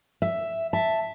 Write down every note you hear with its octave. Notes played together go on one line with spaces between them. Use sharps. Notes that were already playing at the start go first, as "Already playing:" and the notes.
E5
E5 A5